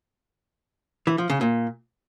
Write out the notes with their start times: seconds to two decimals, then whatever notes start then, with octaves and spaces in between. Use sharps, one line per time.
1.07 E3
1.18 F3
1.30 C#3
1.41 A#2